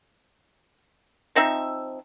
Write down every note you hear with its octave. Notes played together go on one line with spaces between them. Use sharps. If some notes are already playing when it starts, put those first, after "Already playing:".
F3 C4 D#4 E5